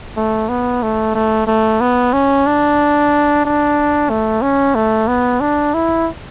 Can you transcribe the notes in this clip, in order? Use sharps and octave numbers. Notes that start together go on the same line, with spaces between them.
A3
B3
A3
A3
A3
B3
C#4
D4
D4
A3
C#4
A3
B3
D4
E4